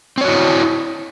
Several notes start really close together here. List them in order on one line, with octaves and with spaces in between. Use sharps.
C4 C#5 F#4 E4